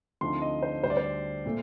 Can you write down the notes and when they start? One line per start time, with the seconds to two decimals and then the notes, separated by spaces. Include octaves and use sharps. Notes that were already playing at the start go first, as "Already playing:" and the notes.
0.21 D2 D3 F3 C4 D#4 C6
0.42 D#5
0.63 C5
0.83 D2 D3 G3 C5
0.90 D5
0.97 C5
1.46 A#2 A3